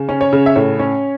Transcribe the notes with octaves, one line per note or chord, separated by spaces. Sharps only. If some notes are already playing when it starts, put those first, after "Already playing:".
Already playing: C#3
C#4
C#5
C#3
E5
A2 C#5
C#4